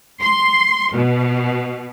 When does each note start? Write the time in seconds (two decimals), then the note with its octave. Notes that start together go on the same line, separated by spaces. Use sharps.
0.24 C6
0.95 B2